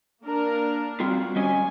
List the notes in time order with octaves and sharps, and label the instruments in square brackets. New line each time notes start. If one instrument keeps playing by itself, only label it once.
[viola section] A#3 D4 A#4
[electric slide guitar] G3 C4 F4 [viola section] F#4
[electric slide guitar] G3 C#4 D#5 [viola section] G#5